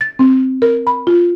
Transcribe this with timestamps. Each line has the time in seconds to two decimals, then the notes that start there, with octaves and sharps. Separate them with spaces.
0.01 A6
0.19 C4
0.62 A#4
0.87 B5
1.07 F4